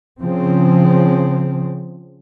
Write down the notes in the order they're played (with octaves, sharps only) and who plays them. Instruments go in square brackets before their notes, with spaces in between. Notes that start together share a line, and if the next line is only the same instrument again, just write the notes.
[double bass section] C#3 F3 C4